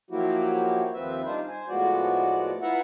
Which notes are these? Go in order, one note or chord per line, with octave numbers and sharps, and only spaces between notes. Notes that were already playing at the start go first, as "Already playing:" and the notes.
F3 F#3 A#3 E4 F#4 G4
D#2 F3 C4 B4 E5
G3 D4 D#4 F4 C5
C5 G#5
A2 F3 G#3 B3 F#4 D5
E4 F4 B4 E5 F#5 A#5